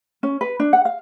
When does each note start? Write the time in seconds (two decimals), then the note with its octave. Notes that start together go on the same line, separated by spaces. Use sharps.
0.23 C#4
0.41 B4
0.60 D4
0.73 F#5
0.85 F5